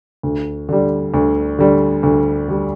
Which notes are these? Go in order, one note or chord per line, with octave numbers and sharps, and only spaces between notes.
D2
D3 G3
D2
D3 G3
D2
D3 G3